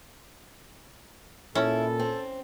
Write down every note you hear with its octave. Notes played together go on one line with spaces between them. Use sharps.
A#2 C#4 E4 A4
C4